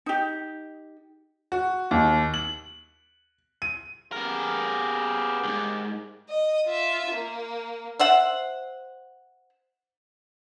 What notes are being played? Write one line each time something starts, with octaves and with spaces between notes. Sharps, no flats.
D#4 G4
F#4
D#2
F#7
D#7
A#3 B3 G4 G#4 A#4
C#2 G#2
D#5
F4 E5
A#3
C5 E5 F#5